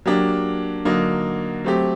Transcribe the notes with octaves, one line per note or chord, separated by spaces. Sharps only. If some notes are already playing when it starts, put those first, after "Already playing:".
F#3 A#3 D4 G4
D3 F#3 A#3 D#4
F#3 A3 C4 G4